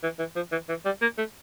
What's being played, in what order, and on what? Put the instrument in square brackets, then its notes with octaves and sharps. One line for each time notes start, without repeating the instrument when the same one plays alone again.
[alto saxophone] E3
E3
F3
E3
E3
G3
A#3
A3